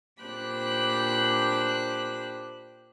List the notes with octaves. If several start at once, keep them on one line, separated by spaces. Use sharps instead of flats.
A#2 D4 G4 C5 B5 F#6